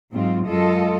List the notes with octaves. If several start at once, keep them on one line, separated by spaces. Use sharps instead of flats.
G#2 F#3 C4 F4
F#2 G#3 F4 A4 D#5